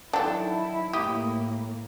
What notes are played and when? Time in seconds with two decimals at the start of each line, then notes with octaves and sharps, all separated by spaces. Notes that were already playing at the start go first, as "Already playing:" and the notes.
0.13 D#3 F#3 D4 E4 A4 F#5 G5 A5
0.93 A2 A#3 G4 D6 D#6